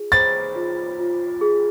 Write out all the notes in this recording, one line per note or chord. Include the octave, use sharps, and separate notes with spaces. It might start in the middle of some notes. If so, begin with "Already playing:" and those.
Already playing: F4 G#4
C5 A6
F4
F4
G#4